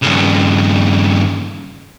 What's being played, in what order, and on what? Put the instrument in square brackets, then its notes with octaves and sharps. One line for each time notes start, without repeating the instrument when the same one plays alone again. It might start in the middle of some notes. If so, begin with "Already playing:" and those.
[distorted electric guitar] G2 C#3